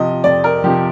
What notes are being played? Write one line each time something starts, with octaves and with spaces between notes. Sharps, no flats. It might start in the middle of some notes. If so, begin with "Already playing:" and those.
Already playing: C3 F3 D#5
F2 D5
A#4
C3 F3 G4